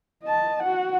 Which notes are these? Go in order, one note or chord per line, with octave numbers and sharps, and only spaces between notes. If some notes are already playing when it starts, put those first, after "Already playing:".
D#5 A5
F#4 F#5